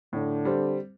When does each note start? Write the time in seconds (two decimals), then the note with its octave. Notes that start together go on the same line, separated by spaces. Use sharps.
0.13 A2 D3
0.45 G3 C4